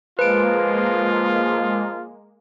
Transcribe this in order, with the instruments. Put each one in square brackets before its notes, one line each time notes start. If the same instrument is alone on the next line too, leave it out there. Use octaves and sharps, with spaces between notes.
[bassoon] F3 [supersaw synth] G#3 A#3 [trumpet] F4 [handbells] B4 D7